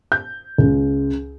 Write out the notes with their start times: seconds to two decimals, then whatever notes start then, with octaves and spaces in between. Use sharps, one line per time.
0.12 G6
0.58 C#2